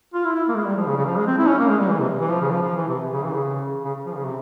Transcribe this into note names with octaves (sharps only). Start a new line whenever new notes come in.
F4
E4
E4
A#3
G#3
G3
F3
C#3
C#3
F3
G#3
C4
E4
C#4
A#3
G#3
G3
E3
C3
E3
F3
C#3
F3
F3
E3
C3
C#3
E3
C#3
C#3
F3
C#3
C3